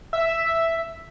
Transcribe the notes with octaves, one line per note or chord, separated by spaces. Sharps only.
E5